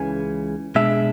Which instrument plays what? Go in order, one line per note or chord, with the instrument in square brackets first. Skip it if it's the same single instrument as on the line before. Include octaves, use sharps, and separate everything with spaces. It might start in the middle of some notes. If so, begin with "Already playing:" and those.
Already playing: [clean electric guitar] C#2 C#3 E3 G#5
B2 G#3 D4 E5